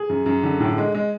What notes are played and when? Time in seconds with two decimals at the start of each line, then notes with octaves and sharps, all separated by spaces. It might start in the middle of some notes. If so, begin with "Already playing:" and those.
Already playing: G#4
0.09 F#2
0.26 F#2
0.43 D3
0.60 A2
0.78 G#3
0.95 G#3